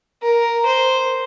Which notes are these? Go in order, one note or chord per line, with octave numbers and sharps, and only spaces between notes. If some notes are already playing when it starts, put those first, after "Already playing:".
A#4
C5